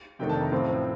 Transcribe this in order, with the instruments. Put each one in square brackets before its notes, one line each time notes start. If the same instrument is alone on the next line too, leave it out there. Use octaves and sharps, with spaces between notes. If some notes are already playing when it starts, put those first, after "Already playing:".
[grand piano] F2 C3 D#3 A3 D4 G5
A5
A#5
A1 A2 F3 C4